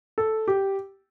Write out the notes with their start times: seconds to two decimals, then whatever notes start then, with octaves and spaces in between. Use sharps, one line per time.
0.18 A4
0.47 G4